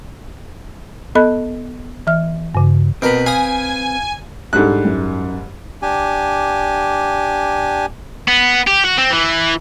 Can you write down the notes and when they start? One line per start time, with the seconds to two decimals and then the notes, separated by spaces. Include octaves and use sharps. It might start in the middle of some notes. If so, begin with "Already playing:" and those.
1.15 B3 A4 D#5 B5 F#6
2.07 E3 E5 F6
2.55 G2 C#3
3.02 B2 C4 A#4 B4
3.26 F5 G#5 D#6
4.53 G#2 G3 D4 A4 F#6
4.84 F#2
5.82 D4 G4 G#5
8.28 B3
8.67 G4
8.85 F#4
8.98 C4
9.11 E3